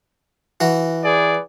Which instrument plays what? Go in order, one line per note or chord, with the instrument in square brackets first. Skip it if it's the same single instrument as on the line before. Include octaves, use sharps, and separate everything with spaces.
[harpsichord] E3 F#4
[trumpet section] G#4 B4 D5